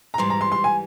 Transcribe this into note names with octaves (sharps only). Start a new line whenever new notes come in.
A#5
G#2 E3 G3 C6
A#5
C6
C6
G#5